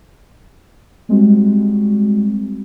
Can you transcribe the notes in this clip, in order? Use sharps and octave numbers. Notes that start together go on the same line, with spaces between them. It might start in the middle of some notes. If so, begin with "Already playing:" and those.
G3 G#3 C4 F#4